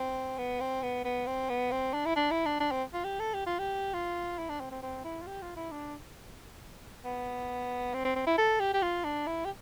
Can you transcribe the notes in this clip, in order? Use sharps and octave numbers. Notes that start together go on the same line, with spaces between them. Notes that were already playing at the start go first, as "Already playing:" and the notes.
Already playing: C4
B3
C4
B3
B3
C4
B3
C4
D4
E4
D4
E4
D4
D4
C4
F4
G4
A4
G4
F4
G4
F4
E4
D4
C4
C4
C4
E4
F4
G4
F4
E4
D4
B3
C4
C4
C4
E4
A4
G4
G4
F4
D4
E4
G4